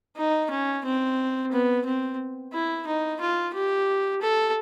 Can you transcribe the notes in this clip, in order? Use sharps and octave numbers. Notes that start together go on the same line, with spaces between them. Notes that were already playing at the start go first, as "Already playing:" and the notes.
D#4
C#4
C4
B3
C4
E4
D#4
F4
G4
A4